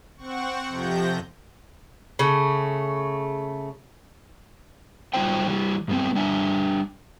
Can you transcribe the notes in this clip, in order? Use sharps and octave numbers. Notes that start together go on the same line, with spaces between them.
C4 F#5 C#6
F2 C3 F3 G6 A#6
C#3 A3
F#3 G3 D#4 F4 C5 G5
E3 G3
G2 G3 B3 C4
G3 D4 E5 G#5